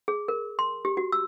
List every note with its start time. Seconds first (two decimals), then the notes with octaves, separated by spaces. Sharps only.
0.08 G#4
0.28 A#4
0.59 C6
0.85 G4
0.97 F#4
1.12 E6